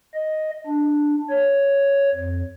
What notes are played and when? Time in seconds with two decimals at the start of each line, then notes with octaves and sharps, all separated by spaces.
0.14 D#5
0.66 D4
1.30 C#5
2.14 F2